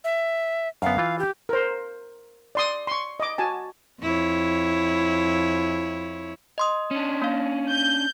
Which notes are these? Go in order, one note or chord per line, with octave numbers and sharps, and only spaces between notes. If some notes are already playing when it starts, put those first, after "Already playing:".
E5
F#2 D3 B3 F5
E3 F4
G4
A#4 C5
D5 C6 D#6
C6 C#6
D#5 D6
F#4 G#5 A5
F2 E4 C#5
D#5 C6 D#6
C#4 D4
A#3 F5
G6